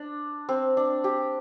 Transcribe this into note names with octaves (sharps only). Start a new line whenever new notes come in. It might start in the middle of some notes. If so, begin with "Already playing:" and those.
Already playing: D4
C4
D4
G4